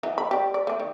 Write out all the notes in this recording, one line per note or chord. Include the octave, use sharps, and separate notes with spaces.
E3 F#3 D#4
B5
G4 D5
D5
A3 D5
D#3